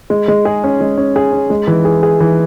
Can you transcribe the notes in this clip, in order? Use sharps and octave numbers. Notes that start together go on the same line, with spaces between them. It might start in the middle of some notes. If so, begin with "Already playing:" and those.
G#3
G#3
G#4
C#4
G#3
C#4
G#4
C#4
G#3
E3
G#4
G#4
E3